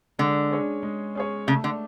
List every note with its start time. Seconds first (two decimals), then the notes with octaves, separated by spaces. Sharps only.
0.19 D3 G#3
0.51 C#4 G#4 C#5
0.83 G#3
1.15 C#4 G#4 C#5
1.47 C#3 A3
1.64 D3